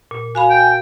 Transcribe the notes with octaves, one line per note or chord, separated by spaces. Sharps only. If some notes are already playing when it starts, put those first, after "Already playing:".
A#2
F#4 F5 G#5 B5
G5